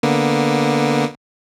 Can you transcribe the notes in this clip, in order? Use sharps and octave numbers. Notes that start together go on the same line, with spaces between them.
D3 A#3 B3